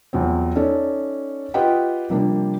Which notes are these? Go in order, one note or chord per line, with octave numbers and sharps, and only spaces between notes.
E2 F3 F#3 C4
C#4 D#4 A4 C#5 D5
F4 G4 B4 D#5 F#5 G5
C3 F3 G3 A#3 D4